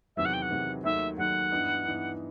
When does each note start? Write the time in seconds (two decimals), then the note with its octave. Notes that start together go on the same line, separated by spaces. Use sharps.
0.16 E2 C3 D#3 F#3 B3 E5
0.25 F#5
0.33 G5
0.42 F#5
0.50 E2 C3 D#3 F#3 B3
0.84 D#2 D#3 F#3 A3 E5
1.17 D#2 D#3 F#3 A3 F#5
1.52 G2 E3 B3 D#4
1.85 G2 E3 B3 D#4